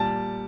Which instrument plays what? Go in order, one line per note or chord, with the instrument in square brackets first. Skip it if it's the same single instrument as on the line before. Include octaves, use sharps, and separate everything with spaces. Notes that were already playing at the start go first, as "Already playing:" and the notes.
Already playing: [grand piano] A#2 G3 A5